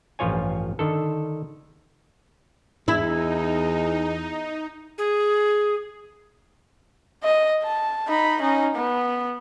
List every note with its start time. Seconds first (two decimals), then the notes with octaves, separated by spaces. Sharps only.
0.19 A1 G2 F3 F4 C#5 G#5
0.79 D3 D#3 A4
2.88 E2 D#4 E4
4.98 G#4
7.23 D#5
7.63 A5
8.08 D#4 B5
8.40 C#4 D#4
8.75 B3